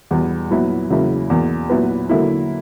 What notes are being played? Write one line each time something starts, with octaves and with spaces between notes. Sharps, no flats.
E2 B2 G3 B3
A#2 F#3 B3 E4
E2 C#3 F#3 A#3 E4
E2 B2 A#3
A#2 F#3 B3 E4 B4
D3 F#3 A#3 E4